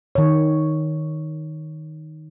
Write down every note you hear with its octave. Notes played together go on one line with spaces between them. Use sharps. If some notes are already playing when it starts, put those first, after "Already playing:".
D#3 C#5